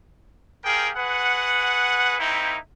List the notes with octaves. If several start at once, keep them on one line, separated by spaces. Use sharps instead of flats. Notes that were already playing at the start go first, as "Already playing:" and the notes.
C4 G4 G#4 A#4 F5 G5
F#4 G#4 B4 F#5
A#3 C4 D#4 E4